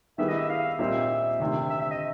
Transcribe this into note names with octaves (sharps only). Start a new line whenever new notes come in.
D#3 G3 B3 E4 G#4 E5
D#5
E5
F5
A#2 G3 C4 D#4 E5
D2 C3 D#3
E5
E5
D#5